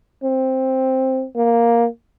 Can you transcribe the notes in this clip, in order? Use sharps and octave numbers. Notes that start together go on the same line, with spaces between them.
C4
A#3